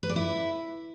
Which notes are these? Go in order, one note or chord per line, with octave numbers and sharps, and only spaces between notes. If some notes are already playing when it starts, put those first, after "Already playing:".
B4
D5
E4